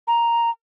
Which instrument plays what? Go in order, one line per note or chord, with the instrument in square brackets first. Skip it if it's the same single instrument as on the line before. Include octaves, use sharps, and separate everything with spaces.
[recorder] A#5